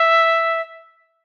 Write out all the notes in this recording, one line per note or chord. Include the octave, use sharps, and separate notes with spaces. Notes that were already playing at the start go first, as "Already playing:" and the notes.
Already playing: E5